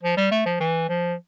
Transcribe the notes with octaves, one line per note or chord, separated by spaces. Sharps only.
F3
G3
A3
F3
E3
F3